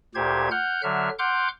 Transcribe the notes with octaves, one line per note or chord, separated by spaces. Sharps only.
D2 A#2 G4 C5 G#6
F#5 F6 G6
D3 F#3 E5 F6
F#5 C6 D6 F6 G6